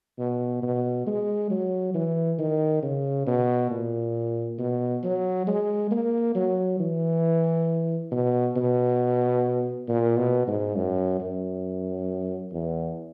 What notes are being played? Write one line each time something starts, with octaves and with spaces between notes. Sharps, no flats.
B2
B2
G#3
F#3
E3
D#3
C#3
B2
A#2
B2
F#3
G#3
A#3
F#3
E3
B2
B2
A#2
B2
G#2
F#2
F#2
E2